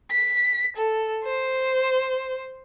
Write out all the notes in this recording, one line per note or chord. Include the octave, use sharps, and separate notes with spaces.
B6
A4
C5